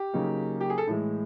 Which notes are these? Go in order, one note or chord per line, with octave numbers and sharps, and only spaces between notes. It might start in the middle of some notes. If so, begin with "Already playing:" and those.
Already playing: G4
C#3 F#3 A#3 D#4
G4
G#4
A4
A2 E3 G#3